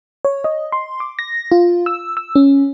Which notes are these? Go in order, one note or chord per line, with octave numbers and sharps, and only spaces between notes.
C#5
D#5
C6
D6
A#6
F4
E6
E6
C#4